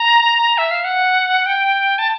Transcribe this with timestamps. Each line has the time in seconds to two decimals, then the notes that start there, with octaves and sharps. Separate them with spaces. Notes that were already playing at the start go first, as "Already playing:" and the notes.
Already playing: A#5
0.58 E5
0.71 F5
0.84 F#5
1.46 G5
1.98 A5